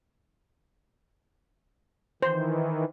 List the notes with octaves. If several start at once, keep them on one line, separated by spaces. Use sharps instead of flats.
D#3 E3 C5